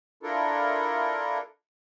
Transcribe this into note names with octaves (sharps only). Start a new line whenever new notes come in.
D4 E4 F4 A4 A#4